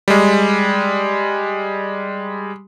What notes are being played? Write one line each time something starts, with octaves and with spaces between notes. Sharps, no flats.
G3 G#3